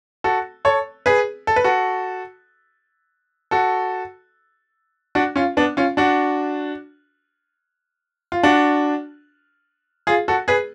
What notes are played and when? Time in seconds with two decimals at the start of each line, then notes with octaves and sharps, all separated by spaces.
0.24 F#4 A4
0.65 A4 C#5
1.06 G#4 B4
1.47 A4
1.56 B4
1.64 F#4 A4
3.51 F#4 A4
5.15 D4 F#4
5.36 C#4 F4
5.57 B3 D4
5.77 C#4 F4
5.97 D4 F#4
8.32 F4
8.43 D4 F#4
10.07 F4 G#4
10.28 F#4 A4
10.48 G#4 B4